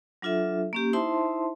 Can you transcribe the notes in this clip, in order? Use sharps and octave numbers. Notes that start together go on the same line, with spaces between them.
F#3 D4 F4 A4 E5
A#3 C#4 G4
D#4 E4 C5 E5 A5 C6